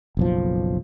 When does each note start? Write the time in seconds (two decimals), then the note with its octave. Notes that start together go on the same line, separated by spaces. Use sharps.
0.17 F#1 B1 F3